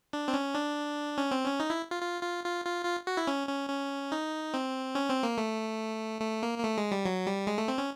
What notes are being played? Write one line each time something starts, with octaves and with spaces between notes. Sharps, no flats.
D4
C4
C#4
D4
C#4
C4
C#4
D#4
E4
F4
F4
F4
F4
F4
F4
F#4
E4
C#4
C#4
C#4
D#4
C4
C#4
C4
A#3
A3
A3
A#3
A#3
A3
G#3
G3
F#3
G3
G#3
A3
C4
C#4